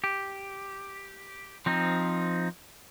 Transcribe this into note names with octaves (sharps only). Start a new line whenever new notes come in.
G4
F3 C4 D#4